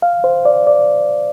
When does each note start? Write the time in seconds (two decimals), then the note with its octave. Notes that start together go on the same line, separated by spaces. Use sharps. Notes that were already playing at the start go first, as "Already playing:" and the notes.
0.02 F5
0.24 C5
0.45 D5
0.67 D5